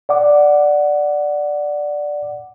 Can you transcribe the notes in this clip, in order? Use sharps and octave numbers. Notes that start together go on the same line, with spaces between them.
D5 F#5 D6